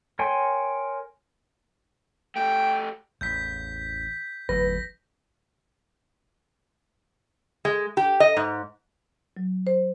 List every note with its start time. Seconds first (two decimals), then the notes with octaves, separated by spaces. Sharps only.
0.19 A#4 C#5 G5 G#5 C6
2.36 A3 G4 G5
3.21 A1 E2 G6 B6
4.49 G1 E2 F#3 A3 B4 A#6
7.65 G#3
7.97 G4
8.20 D#5
8.37 G#2
9.37 F#3
9.67 C5